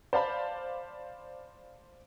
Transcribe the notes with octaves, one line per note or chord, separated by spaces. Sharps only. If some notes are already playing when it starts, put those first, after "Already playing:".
C5 D5 F5 A5 B5